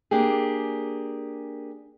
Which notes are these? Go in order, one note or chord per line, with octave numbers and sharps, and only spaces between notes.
A#3 D4 G4 G#4